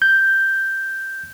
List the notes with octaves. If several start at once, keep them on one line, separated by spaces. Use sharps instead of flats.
G6